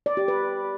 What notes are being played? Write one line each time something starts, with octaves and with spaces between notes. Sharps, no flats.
D5
G4
B4